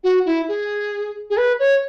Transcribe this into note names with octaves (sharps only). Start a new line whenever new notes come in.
F#4
E4
G#4
G#4
B4
C#5